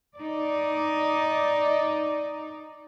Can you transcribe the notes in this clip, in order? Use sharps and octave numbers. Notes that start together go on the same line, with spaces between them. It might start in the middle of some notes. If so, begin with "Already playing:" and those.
D#4 D5